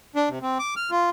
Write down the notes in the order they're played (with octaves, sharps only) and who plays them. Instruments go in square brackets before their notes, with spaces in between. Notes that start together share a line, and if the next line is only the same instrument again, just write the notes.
[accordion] D4
C3
C4
D6
F6
F4